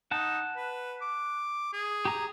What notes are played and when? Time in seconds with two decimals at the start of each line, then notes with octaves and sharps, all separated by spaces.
0.11 D#4 F#5 A5
0.56 B4
1.02 D6
1.73 G#4
2.05 G4 A#5 D#6